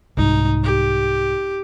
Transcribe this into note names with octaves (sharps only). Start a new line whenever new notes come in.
C2 G#2 D#4
G4